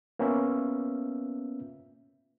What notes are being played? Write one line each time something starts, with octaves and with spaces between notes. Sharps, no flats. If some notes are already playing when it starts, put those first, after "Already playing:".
A#3 B3 C#4 F4 E5